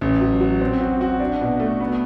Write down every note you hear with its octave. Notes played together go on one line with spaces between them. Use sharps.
A1
F#3
F#3
C4
F#4
F#4
D4
B2
A3
B3